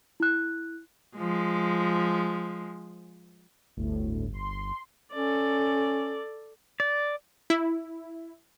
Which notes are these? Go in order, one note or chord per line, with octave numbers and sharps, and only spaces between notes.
E4 F#6
F3 G#3
G1 D2 A2
C6
C#4 A4 D5
D5
E4